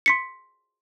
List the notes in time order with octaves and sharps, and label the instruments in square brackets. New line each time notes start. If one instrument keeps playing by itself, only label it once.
[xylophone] C6 B6 C#7